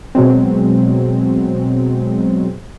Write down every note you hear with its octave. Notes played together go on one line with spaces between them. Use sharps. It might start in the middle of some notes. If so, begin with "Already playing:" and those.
B2 F#3 G#3 C4